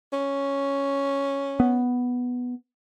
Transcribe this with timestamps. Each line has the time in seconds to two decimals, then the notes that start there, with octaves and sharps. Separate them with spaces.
0.13 C#4
1.60 B3